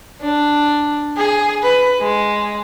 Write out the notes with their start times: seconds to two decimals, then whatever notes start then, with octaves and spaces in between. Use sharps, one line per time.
0.21 D4
1.17 G#4
1.63 B4
2.01 G#3